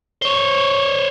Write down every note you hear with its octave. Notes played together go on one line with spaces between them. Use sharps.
C5 C#5